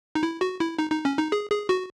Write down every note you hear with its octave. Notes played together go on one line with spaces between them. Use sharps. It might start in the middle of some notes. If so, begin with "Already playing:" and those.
D#4
E4
F#4
E4
D#4
D#4
C#4
D#4
G#4
G#4
F#4